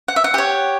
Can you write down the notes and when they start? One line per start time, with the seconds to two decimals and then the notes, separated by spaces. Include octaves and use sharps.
0.08 F#5
0.16 E5
0.24 F#5
0.34 G4 C#5